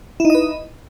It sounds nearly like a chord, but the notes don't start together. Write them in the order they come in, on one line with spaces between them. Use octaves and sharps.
E4 D#4 D#5 B4